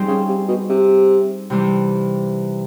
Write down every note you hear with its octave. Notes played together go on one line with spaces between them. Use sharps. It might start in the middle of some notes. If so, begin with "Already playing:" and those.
Already playing: G3 C4 D#4 G#4 C5
C#3
C3
B2
C3
C3 E3 G3